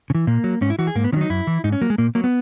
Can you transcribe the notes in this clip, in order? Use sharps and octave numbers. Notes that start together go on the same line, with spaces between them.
C#3
E3
A#2 A#3
F#3
G#2 C#4
E4
E3 F#4
G#4
G#2 A#3
B3
D#3 F#3 C#4 D#4
F#2 E4
E3
G#2 D#4
C#4
F#3 A#3
G#3
A#2 A#3
F#3 A#3
B3